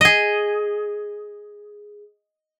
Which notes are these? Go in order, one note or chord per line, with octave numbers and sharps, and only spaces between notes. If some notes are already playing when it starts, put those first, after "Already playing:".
G#4 D#5